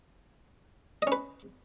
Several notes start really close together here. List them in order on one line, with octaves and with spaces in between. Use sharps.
D#5 C#4 B4